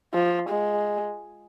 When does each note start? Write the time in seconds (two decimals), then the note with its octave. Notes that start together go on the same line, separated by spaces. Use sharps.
0.14 F3
0.50 G#3